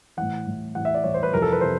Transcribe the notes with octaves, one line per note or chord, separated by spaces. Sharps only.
A2 E3 F#5
A2 E3
A2 E3 F#5
E5
D5
A2 E3 C#5
C5
B4
F2 C3 E3 A#4
A4
B4
C3 C5